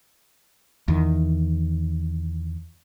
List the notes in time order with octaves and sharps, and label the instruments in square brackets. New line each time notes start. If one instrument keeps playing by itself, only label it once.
[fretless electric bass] E2 D#3